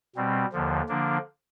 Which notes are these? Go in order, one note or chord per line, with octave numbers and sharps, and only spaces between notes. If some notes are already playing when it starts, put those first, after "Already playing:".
B2 G3 C4
D#2 D3 F3
D3 F3 A#3 D4